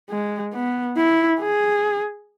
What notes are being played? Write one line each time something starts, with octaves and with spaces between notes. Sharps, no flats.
G#3
B3
E4
G#4